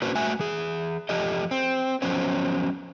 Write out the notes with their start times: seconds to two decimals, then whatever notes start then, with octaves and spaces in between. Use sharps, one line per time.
0.02 A#3 C#4 D4 F#4 B4 C5
0.15 A3 F#4 E5 G#5
0.39 E3 G#4
1.09 F2 F3 G4 A4 D#5
1.51 C4
2.02 F3 F#3 B3 C#4 C5